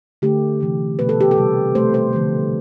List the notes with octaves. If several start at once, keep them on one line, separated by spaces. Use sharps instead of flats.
D3 A3 G4
C3 E3 A3
B2 A3 B4
A4
G4
A4
C3 G3
B2 A3 C5
C5
D3 F3 A3